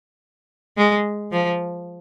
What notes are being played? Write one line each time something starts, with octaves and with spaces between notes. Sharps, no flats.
G#3
F3